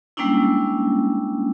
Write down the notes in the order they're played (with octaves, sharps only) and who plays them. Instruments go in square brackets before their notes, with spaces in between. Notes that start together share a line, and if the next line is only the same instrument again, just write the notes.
[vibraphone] G3 G#3 A#3 C#4 D4 E4